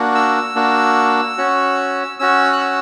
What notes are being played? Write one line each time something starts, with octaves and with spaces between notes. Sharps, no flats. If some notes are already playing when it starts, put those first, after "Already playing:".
Already playing: A#3 D4 F#4
E6
A#3 D4 F#4
C#4 F#4
C#4 F#4 E6
F#6
E6